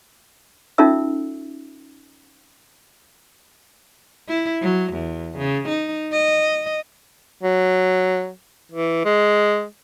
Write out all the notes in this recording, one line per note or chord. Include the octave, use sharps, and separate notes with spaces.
C#4 D#4 F4 A4 E5 E6
E4
F#3
E2
C#3
D#4
D#5
F#3
E3
G#3